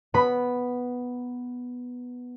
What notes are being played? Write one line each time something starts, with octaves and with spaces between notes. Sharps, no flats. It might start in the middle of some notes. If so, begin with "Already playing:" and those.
B3 B5